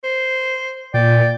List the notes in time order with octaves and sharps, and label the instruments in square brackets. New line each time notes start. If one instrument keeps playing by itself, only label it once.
[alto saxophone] C5
[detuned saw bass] A#2 [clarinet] D5 [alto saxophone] G5